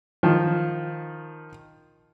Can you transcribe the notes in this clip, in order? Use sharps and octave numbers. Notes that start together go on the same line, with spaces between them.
D#3 F3